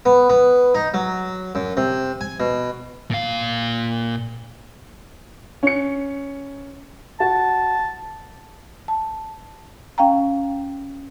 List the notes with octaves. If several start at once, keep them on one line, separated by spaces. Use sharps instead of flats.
B3
B3
D#4
F#3
F#2
C3
G#5
B2
A#2 F5
C#4 C#7
F#4 A5
A5
C#4 F5 G5 A#5